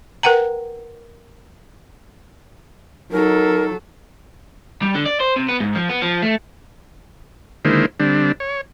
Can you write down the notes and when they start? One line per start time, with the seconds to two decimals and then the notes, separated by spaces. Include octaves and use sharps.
0.23 A#4 B4 F#5 G5 A#5
3.12 F#3 D#4 A4 A#4
4.82 G3
4.95 D3
5.06 D5
5.20 C5
5.36 C3
5.48 B3
5.60 G#2
5.75 F3
5.89 B3
6.02 F3
6.23 A3
7.65 D3 D#3 G#3 A#3 E4 C5
8.00 D3 G3 C4 D4
8.40 C#5